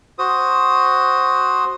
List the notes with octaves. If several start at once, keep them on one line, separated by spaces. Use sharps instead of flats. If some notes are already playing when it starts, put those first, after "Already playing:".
F#4 C5 D#6